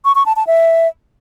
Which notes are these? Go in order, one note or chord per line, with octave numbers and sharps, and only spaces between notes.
C#6
C#6
A5
A5
E5